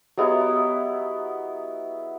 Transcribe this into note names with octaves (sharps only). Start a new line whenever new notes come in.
F#3 B3 E4 G4 G#4 D#5